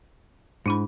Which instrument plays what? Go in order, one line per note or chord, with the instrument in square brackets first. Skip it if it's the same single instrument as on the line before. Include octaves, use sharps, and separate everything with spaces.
[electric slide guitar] G#2 [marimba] D4 E4 B5